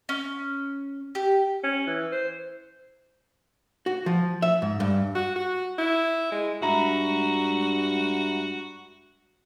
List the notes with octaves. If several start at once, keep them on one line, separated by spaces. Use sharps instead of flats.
C#4
G4
C#4
E3
C5
F#4
F3
E5
G#2
G2
F#4
F#4
E4
G#3
G2 G#3 D4 F#4 E5 A#5 B5